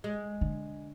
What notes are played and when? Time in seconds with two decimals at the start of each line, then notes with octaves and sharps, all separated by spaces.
0.04 G#3
0.41 D3